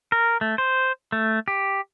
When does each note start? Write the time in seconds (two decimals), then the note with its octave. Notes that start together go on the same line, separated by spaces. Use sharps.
0.12 A#4
0.41 A3
0.58 C5
1.12 A3
1.48 G4